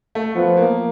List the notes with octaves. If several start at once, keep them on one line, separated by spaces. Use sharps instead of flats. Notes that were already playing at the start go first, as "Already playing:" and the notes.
A3
F3 B3
A#3